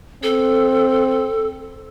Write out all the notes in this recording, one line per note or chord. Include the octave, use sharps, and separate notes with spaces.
C4 A4